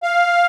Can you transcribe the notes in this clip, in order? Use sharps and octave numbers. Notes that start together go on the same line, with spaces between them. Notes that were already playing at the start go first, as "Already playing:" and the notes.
F5